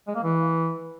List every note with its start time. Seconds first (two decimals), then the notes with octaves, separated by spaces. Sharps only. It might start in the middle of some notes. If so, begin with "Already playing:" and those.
0.07 G#3
0.15 A#3
0.23 E3